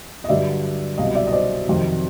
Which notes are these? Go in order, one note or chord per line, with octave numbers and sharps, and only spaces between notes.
D#5
G2 D3 F#3 D5 E5
C2 B2 F#3 D#5 F5
D5 E5
D#5
C5 D5
F2 C3 D#3 F#3